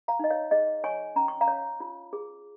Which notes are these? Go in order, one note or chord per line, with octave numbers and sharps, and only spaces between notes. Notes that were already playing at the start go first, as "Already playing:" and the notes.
F5 A#5
D#4 D#5
C#5 F5
G#4 D#5
C#5 G#5 C#6
C#4 A#5
C#6
F5 A#5
C#5
F4
G#4